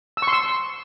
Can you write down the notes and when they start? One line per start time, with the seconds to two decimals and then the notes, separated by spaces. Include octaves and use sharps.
0.17 E6
0.22 C#6
0.28 C6
0.33 E6